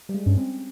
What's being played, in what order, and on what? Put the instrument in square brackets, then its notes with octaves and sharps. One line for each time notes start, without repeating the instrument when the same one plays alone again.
[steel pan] G3
G#3
[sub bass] G2 [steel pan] C#4
[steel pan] C4